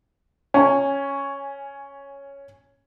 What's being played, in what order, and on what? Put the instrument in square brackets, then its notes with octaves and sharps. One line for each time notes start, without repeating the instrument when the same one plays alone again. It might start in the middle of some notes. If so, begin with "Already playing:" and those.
[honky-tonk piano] C#4 G#5